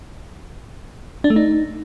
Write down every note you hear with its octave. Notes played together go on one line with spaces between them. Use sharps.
D4
A3
D#4